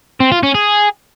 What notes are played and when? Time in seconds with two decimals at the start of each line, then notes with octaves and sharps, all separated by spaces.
0.20 C4
0.32 F4
0.43 C#4
0.55 G#4